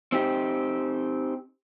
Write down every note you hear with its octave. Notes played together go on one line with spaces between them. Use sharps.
C4 D#4 G4